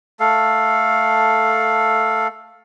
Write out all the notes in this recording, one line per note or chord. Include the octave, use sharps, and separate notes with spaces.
A3 A4 F5